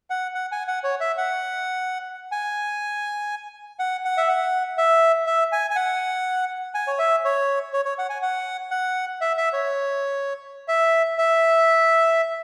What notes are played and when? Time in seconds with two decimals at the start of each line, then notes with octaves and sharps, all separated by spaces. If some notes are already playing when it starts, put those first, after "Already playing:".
0.10 F#5
0.35 F#5
0.52 G#5
0.68 F#5
0.84 C#5
1.00 E5
1.18 F#5
2.32 G#5
3.79 F#5
4.05 F#5
4.17 E5
4.28 F#5
4.78 E5
5.27 E5
5.52 G#5
5.70 G#5
5.76 F#5
6.75 G#5
6.87 C#5
6.99 E5
7.25 C#5
7.73 C#5
7.85 C#5
7.98 F#5
8.10 G#5
8.22 F#5
8.71 F#5
9.21 E5
9.37 E5
9.53 C#5
10.68 E5
11.18 E5